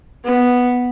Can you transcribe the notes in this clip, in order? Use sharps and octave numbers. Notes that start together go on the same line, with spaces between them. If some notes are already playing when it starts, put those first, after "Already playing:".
B3